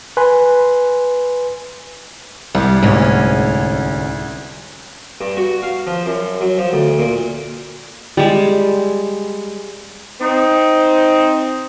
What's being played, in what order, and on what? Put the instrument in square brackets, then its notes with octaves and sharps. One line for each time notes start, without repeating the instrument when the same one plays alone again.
[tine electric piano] B4 G#5 C6
[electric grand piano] C2 [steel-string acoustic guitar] G3
[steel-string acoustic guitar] D2 C#4 [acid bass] G#2
[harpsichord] G2
F#4
F5
F3
F#2
F#3
F3
D2
A#2
[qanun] G3 G#3
[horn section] C4 D#4